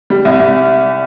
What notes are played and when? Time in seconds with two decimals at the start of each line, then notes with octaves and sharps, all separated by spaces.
0.10 G3
0.25 C2
0.40 C2